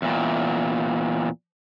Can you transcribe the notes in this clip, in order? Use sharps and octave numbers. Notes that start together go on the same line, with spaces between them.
E2 A#2